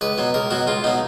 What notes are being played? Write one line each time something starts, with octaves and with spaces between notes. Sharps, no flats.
C#2 B4
B2 F#3
C#2 A#4
B2 F#3 F#4
C#2 F4
B2 F#3 D#4